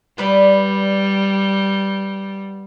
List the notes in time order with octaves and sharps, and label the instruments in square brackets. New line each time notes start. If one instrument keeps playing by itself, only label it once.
[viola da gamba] G3 [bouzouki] B3 B4 D5